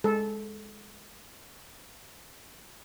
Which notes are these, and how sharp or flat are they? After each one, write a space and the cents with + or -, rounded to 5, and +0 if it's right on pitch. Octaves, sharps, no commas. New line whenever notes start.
G#3 -5 A4 -15